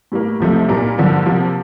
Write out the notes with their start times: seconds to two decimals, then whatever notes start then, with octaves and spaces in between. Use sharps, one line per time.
0.12 A2 G3 A#3
0.40 C2 C3 F3 A3 D#4
0.68 A#2 G3 A#3 D#4 A#4
0.98 G2 D3 F3 A#3
1.26 C3 F3 A#3